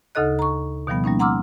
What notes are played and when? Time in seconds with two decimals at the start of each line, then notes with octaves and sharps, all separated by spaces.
0.15 D2 C#3 D#4 A4 D#5 F#6
0.39 A#5 C#6
0.87 B2 D#3 F3 G3 B3
1.04 G3 A#3 C#4 D#4
1.19 F#5 A#5 C6 D6 E6 F6